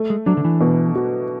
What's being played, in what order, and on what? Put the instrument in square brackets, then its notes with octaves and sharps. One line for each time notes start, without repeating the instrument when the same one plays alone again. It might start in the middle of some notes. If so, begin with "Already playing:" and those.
Already playing: [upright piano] A3
[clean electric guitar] G#3
[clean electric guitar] F#3 [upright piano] D4
[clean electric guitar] D3
E3
[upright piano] B2
F#4